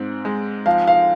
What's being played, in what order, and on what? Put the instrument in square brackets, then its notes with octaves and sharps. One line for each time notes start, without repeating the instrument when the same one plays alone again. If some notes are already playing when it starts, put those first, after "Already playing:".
Already playing: [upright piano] G#2 C4
G#3
[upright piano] F3 [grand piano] F5
[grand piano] F5